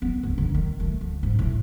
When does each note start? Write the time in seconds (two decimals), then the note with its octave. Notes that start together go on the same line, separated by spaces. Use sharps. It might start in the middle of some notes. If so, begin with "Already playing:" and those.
0.02 B3
0.23 D2
0.38 D3
0.55 D#3
0.80 A3
1.01 D2
1.23 G#2
1.39 A2